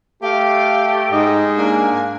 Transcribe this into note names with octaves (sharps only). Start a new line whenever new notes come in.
A3 G4 F5
G#2 D#4 D#5
A#3 D4 G#5